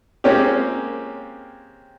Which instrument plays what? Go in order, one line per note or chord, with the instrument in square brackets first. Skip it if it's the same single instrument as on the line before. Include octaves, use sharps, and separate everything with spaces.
[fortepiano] G#3 A#3 C4 C#4 F4 G4